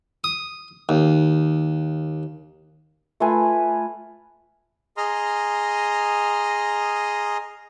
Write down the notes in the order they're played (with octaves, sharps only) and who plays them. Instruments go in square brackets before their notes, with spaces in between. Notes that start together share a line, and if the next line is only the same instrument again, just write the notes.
[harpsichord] D#6
D#2
[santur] A3 F4 B4 G#5
[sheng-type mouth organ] G#4 D#5 A#5 C6 D#6 F6